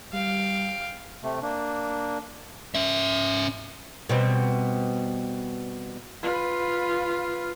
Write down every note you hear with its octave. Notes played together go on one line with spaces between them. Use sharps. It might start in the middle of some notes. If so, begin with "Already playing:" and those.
G3 F5 G5
C3 A3
A#3 D4
C#4 E5
B2 G3 C4
F4 B4